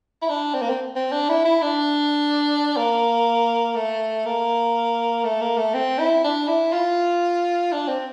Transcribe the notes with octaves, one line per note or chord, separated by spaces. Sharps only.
E4
D4
C4
A#3
C4
C4
D4
E4
E4
D4
A#3
A3
A#3
A3
A#3
A3
C4
E4
D4
E4
F4
D4
C4